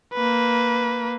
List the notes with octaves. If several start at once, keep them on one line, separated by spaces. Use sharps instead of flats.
A#3 B4